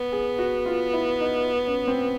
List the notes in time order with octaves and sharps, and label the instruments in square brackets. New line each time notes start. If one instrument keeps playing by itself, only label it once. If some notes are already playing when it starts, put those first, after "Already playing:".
Already playing: [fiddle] B3
[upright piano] G#4
F#4
F4
E4
D#4
C#4
C4